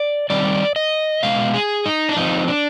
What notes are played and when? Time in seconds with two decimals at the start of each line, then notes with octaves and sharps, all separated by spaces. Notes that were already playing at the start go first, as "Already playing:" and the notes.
Already playing: D5
0.30 D#3 G3 C4 D5
0.76 D#5
1.23 B2 G#3 F5
1.54 G#4
1.86 D#4
2.09 D4
2.17 F3 C4 D#4
2.48 D4